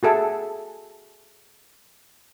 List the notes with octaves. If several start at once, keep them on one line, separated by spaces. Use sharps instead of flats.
F#4 G#4 A4 E5